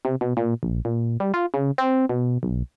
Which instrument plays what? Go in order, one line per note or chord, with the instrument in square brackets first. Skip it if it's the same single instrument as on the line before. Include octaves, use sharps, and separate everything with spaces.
[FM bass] C3
B2
A#2
A#1
A#2
G3
F4
C#3
C4
B2
B1